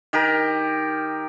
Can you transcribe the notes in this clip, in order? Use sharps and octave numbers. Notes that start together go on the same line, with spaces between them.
D#3 G4 A#4